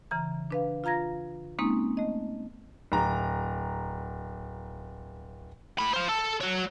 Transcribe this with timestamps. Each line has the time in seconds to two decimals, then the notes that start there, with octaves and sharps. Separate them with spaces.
0.11 C#3 E3 A#5
0.51 D4 B4 F5
0.84 F4 F5 A#5 G#6 A#6
1.59 G#3 A#3 C4 C#4 D#4
1.97 A3 D#5
2.92 D1 A#5
5.79 A2 B5
5.94 F4 C5
6.09 A4
6.41 F#4 C#5